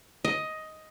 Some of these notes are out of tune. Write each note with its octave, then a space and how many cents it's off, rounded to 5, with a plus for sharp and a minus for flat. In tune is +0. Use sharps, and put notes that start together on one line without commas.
D#5 +10